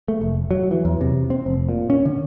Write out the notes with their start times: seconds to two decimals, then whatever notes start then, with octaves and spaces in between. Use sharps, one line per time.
0.08 A3
0.21 F1
0.51 F#3
0.71 E3
0.85 E2
1.01 C3
1.30 C4
1.46 F1
1.69 A#2
1.90 C#4
2.05 D3